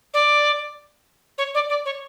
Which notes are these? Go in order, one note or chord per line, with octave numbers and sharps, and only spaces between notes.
D5
C#5
D5
D5
C#5